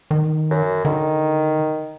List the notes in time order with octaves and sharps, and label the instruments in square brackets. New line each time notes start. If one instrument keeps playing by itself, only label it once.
[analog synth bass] D#3
[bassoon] F#2
[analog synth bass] D3 [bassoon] D#3